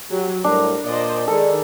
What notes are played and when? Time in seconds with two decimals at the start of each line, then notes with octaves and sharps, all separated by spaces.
0.11 F#3 G4
0.44 A2 G3 D4 A#4
0.85 A#2 C5 D5 D#5
1.28 D#3 G#3 G#4 A4 D5